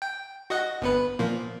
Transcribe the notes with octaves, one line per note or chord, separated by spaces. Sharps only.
G5
F#4 D#5 F#5
G1 B3 B4
A#2 F3 A#3